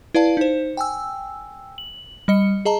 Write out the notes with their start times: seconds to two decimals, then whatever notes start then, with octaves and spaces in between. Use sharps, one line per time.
0.14 E4 B4 D5 F5 A5
0.37 D#4 C5
0.77 G5 G#5 E6
1.78 F#7
2.28 G3 D#5 C#7
2.65 G#4 D#5 A5 A#5